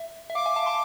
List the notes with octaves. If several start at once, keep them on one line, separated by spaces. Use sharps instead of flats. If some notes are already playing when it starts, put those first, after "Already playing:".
Already playing: E5
E5
F5 D6
E5 G#5
F5 A5
A5 C6